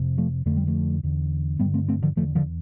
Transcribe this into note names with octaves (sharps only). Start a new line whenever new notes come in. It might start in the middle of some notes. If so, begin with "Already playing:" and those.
Already playing: F2 C3
F3 A3
F2 D3 A3
G3
F3 A3
E2 D3
G2 G3 B3
D3
A3 C4
A3 C4
D3 F3
E2 D3 F3 A3
D3 F3